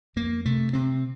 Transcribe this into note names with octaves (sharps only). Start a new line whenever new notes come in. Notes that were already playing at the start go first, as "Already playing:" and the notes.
F2 A#3
C3 A3
C3 C4